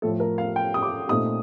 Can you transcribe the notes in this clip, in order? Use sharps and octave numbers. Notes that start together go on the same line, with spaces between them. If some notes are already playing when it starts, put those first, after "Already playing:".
A2 F3 A3 A4
A#4
F5
G5
D#6
D6
A#2 A3 C4 D#4 D#6